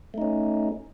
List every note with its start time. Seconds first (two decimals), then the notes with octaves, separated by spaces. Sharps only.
0.14 A3
0.18 D#4
0.22 C#4